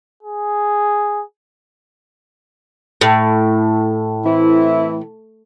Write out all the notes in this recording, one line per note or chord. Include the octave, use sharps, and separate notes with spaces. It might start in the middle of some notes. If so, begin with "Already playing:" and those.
G#4
A2
E3 C4 E4